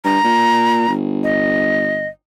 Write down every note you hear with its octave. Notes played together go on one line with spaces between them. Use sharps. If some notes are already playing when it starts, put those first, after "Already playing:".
G2 A#5
A#2
G1
D#5